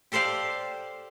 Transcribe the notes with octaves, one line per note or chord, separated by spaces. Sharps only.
G4 A4 C5 D5 F5